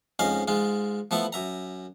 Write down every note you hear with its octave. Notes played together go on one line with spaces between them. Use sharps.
F2 G#2 C#4 D#5 F5
G#2 G#3 F4
F3 A3 B3 E4 A4
F#2 E5 A#5